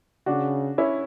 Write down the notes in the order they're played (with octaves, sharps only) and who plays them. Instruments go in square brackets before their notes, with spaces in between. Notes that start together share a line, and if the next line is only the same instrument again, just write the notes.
[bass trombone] C#3 [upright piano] D4 F#4
[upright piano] C#4 E4